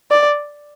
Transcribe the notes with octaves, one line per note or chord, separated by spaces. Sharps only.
D5